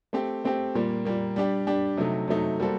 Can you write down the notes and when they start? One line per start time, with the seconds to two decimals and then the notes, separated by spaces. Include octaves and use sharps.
0.13 A3 C4 G4
0.45 A3 C4 G4
0.75 A#2 G3 A#3
1.05 A#2 G3 A#3
1.36 G3 D4 G4
1.67 G3 D4 G4
1.97 C3 F#3 A3 D#4
2.28 C3 F#3 A3 D#4
2.60 G3 A#3 F#4 A4 C5